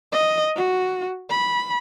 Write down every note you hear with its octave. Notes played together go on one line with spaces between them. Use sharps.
D#5
F#4
B5